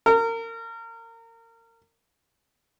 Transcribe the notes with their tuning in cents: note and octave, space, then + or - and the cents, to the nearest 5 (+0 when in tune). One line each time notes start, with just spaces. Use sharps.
A#4 -30